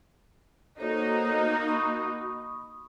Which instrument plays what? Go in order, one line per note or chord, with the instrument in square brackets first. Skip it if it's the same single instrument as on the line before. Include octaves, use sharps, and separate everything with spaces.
[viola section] A#3 D#4 F#4 [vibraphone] A4 C5 C#5
[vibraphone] B5 C#6 D#6